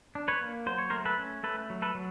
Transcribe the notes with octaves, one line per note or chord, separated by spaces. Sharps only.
D4
B4 C#5
A#3
F#3 C5
C#5
A3 A#4 C5
A4 B4
C#4
A3 A4 B4
F#3
A4 B4
F#3